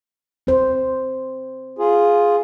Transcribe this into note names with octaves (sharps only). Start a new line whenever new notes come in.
C4 C5
F4 G#4